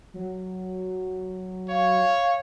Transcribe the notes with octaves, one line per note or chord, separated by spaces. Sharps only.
F#3
C#5 F5